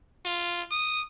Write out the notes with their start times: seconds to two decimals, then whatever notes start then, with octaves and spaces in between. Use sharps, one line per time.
0.25 F4
0.71 D#6